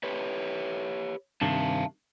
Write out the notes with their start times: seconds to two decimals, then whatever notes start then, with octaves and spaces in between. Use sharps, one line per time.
0.03 G4 B4 C#5
1.42 G2 C3 D#3 E5 F5 A5